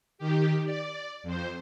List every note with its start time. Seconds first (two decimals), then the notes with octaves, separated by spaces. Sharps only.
0.18 D#3 G4
0.65 D5
1.23 F2 C5